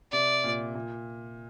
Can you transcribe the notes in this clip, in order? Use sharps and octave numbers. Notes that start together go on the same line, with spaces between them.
C3 D5
A#2
A#2